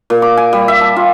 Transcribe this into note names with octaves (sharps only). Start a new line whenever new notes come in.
A#2
D6
G#5
G3
E5
A5
F4